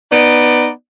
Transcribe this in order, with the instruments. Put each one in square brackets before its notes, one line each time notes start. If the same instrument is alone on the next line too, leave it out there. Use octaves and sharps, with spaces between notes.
[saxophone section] B3 D#4 D5